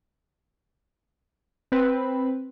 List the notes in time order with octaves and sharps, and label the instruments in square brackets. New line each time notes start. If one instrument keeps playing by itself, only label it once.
[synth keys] C4 B4